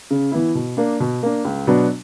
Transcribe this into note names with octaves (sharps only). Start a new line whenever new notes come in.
C#3
E3 B3 E4
B2
A#3 D4
B2
A#3 D4
C#2
B2 F#3 B3 D4